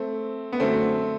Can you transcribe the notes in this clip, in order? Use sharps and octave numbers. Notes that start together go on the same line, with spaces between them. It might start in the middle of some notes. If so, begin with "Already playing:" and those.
Already playing: A3 C4
B3
F#2 D3 F#3 A3 C4